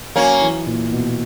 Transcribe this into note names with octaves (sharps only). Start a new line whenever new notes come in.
F#3 A#3 C#4
E3
A#2
B2